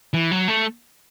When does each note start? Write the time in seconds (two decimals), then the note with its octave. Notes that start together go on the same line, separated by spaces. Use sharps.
0.14 E3
0.31 F#3
0.48 A3